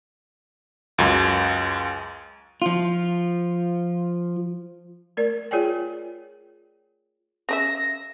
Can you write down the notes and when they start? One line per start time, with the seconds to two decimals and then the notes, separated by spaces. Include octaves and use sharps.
0.98 C#2 F#2
2.62 F3 F4
5.17 A3 A#4 D5
5.51 F4 G#4 C#5 D5 G5 G#5
7.49 C#3 D4 E5 A#6